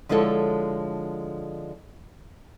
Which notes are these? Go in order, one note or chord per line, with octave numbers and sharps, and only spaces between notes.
D3 F3 G#3 E4 A4 C#5